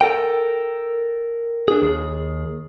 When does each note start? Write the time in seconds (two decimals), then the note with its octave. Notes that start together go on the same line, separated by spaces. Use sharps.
0.01 A4 A#4 G5
1.68 D4 G#4
1.82 D#2 G#4